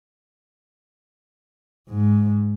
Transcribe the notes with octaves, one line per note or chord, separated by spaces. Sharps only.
G#2